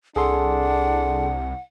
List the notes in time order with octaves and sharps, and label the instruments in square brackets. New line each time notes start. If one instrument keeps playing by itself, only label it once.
[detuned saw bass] C2 [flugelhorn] D4 [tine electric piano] G#4 A4 C6 [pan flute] F#5